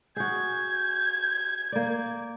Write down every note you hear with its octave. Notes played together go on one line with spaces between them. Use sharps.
F#4 G#4 G6 G#6
A#3 D5